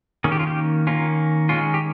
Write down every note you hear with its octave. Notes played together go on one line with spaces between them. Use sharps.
D#3 A#3 C#4 G#4
G4
F4
G4
D#3 A#3 C#4 F4
D#3 G#3 C#4 F4
G4